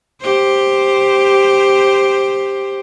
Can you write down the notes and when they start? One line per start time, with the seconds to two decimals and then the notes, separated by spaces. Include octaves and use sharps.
0.22 G4 C5